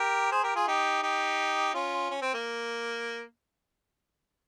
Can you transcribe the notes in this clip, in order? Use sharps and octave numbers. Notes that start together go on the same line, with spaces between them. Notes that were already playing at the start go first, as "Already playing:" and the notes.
Already playing: G4 A#4
G#4 C5
G4 A#4
F4 G#4
D#4 G4
D#4 G4
C#4 F4
C#4
C4
A#3